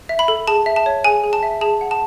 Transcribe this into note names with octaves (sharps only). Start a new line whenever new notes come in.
E5
B5
A4
G#4 A5
E5
A5
C#5
G#4 G#5
G#4
A5
E5
G#4 A5
F#5
A5